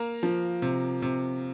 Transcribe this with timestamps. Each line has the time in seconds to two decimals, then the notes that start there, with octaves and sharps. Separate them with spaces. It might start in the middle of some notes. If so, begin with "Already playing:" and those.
Already playing: A#3 A#5
0.23 F3
0.62 C3
1.02 C3